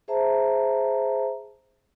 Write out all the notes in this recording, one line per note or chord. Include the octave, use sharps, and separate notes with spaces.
G#4 C5 E5 A5 A#5